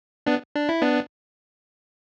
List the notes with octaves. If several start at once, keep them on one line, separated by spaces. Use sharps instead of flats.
B3 D4
D4
E4
B3 D4